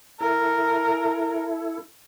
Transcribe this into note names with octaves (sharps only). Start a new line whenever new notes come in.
E4 A4 A#4